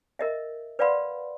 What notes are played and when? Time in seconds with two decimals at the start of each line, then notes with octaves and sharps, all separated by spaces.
0.19 A#4 D#5 E5
0.79 B4 D5 F5 F#5 B5 C6